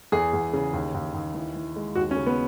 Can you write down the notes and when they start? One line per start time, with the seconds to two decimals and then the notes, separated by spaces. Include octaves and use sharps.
0.12 E2 G#4
0.33 E2
0.53 C#3
0.73 D#2
0.94 D#2
1.14 D#2
1.34 E3
1.56 E3
1.76 G#3
1.95 D#2 F#4
2.11 C#4
2.16 C#3
2.26 B3